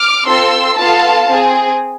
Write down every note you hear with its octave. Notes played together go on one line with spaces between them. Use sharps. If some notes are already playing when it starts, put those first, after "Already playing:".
Already playing: D6 F6
C4 F4 A4 C6 E6
B3 F4 A4 F5 A5
C4 G#4